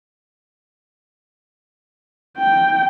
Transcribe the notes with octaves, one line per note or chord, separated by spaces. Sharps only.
G5